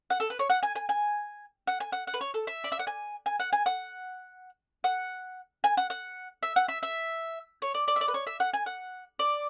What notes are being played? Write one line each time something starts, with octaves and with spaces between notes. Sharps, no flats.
F#5
A4
B4
C#5
F#5
G#5
G#5
G#5
F#5
G#5
F#5
F#5
B4
C#5
A4
E5
D5
E5
F#5
G#5
G#5
F#5
G#5
F#5
F#5
G#5
F#5
F#5
E5
F#5
E5
E5
C#5
D5
D5
E5
D5
B4
C#5
E5
F#5
G#5
F#5
D5